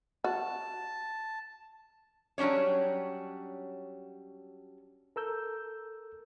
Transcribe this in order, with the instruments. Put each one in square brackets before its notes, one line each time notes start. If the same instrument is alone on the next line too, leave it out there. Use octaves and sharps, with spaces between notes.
[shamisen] F#4 [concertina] A5
[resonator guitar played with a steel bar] F#3 G3 C#4 D4 C#5
[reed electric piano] A4 A#4 E6 G6